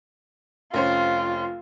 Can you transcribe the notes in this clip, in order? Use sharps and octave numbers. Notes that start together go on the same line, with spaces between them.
F1 C#4 F4 C5